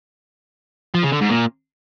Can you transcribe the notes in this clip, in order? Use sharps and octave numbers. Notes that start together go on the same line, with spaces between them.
F3
C#3
D3
G#2
A#2